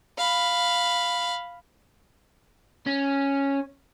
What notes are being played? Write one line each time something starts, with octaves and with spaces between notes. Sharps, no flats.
F5 B5
C#4